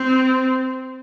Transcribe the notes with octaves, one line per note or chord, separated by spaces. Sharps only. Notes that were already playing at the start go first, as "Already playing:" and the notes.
Already playing: C4